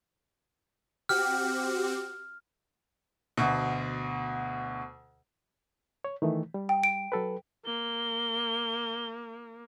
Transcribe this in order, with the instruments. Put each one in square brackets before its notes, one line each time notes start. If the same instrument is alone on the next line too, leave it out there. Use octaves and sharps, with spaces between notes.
[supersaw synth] C4 F#4 G4 [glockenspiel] F6
[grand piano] D2 B2
[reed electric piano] C#5
D#3 E3 A3
G3
[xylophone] G5
D7
[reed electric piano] F#3 A4 B4
[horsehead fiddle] A#3 [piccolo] G7